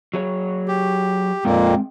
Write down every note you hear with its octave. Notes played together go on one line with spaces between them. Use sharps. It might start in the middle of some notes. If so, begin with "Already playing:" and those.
F#3 G#4 C#5
G4
F2 A#2 G#3 A#3 C4 G5